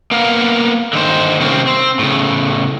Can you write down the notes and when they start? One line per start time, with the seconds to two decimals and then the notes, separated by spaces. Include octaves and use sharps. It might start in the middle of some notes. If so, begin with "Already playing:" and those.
0.11 A#3 B3 F5
0.93 D3 D#3 C5
1.40 C3 G3 A#3 C4 C#4
1.67 C4
1.99 A2 C#3